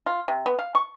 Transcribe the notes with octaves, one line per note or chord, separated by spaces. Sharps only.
F4
C3
B3
F5
C#6